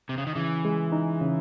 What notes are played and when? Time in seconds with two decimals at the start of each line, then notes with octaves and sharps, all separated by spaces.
0.09 C3
0.18 C#3
0.27 D#3
0.35 C#3 E3
0.65 G#3
0.92 D#4
1.21 C#3